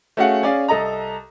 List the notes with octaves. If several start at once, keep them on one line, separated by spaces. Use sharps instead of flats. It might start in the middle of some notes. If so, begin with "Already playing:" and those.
A3 C#4 F#4 G#4 F5 F#5
C#4 G#4 D5 F5
C2 A4 D#5 A#5